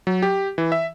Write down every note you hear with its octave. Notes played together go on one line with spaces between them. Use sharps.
F#3
G4
E3
E5